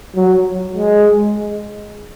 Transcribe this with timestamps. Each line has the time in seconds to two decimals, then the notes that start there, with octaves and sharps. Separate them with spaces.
0.15 F#3
0.75 G#3